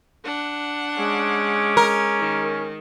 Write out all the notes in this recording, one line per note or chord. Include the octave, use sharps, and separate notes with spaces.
D4 F#5
G#3 C#4 D6
A#4
D#3